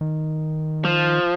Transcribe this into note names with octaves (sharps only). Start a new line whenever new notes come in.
D#3
F3